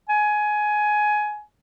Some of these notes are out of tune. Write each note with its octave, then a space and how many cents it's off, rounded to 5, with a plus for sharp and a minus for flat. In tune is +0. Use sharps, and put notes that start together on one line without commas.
G#5 +15